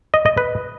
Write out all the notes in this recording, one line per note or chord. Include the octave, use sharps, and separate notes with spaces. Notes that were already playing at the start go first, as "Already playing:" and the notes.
D#5
D#5
B4